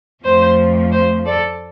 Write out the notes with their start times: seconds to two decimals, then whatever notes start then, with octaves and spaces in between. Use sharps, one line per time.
0.24 F2 F3 A3 C5
0.92 C5
1.26 A4 D5